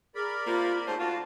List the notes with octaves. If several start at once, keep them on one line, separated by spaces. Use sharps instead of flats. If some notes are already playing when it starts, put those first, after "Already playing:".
G#4 A#4 D5 B5
C3 A#3 F4
G#2 F#3 A3 C4 F4 C5 A5
D2 D4 F4 F#4 D5 F5